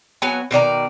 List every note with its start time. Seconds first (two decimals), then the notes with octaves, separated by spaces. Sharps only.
0.22 F#3 B3 G#5
0.51 B2 D#3 D5 A#5